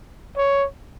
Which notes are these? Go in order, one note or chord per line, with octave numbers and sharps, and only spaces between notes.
C#5